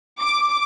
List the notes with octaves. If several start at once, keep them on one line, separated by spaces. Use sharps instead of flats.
D6